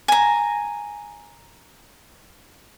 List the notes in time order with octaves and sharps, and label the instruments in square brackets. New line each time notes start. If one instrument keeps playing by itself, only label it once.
[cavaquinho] G#5 A#5